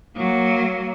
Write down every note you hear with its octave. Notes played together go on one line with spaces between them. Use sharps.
F#3 A#3